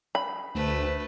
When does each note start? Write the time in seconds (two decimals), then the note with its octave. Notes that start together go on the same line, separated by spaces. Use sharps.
0.15 B5
0.55 D2 A3 B4 C5